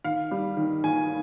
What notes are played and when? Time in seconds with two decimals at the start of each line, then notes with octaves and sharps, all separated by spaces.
0.04 D#3 F5
0.31 G3
0.57 D#3
0.84 D#3 G#5